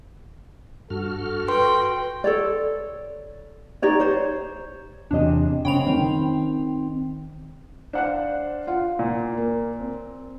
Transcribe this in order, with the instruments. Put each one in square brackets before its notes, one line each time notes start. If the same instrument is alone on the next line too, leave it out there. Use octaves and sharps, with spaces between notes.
[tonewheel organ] G2 F#4 F6 [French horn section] A4
[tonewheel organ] F#4 [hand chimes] B4 C6 [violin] G5
[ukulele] A4 C#5 D5
D#4 G4 C#5 D5
C5 C#5
[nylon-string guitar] E2 C3 D#5 [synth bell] D4
[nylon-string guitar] C#3 C4 [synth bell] G5 B5 F7
[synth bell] D#3 [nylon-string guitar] C4 D#4 G5
[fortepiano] D4 F#5 [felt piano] C5 F5 F#6
[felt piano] F4 F5 F#5
[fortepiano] A#2
[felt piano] A#3
C4